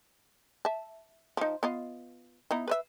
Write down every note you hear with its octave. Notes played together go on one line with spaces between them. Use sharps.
E5 A5
F3 D#4
B3 F4 D#5
B3 D#4 E4
B4 C5 E5